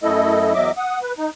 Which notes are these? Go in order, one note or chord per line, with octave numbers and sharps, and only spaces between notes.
F#2 A3 E4 A4 D#5
E2 F#3 D#5 E5 D6
F#5 D#6
B4
D#4